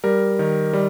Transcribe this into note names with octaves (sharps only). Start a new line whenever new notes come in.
G3 A#4
D#3
G3